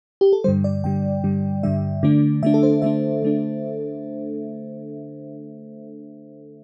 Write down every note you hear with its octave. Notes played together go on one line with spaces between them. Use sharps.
G4
A4
G2 D3 G3 C5
D5
G2 D3 G3 G5
G2 D3 G3
G2 D3 G3 E5
D3 A3 D4
D3 A3 D4 E5
A4
C5
D3 A3 D4 E5
D3 A3 D4